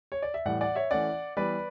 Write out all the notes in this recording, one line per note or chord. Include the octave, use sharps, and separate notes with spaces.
C#5
D5
E5
A2 E3 G3 D5 F#5
D5 F#5
C#5 E5
E3 A3 C#4 D5 F#5
E3 G3 B3 B4 D5